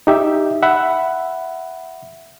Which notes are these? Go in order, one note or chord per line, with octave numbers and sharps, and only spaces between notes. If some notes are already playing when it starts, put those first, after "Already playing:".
D#4 G4 E5
E5 F#5 B5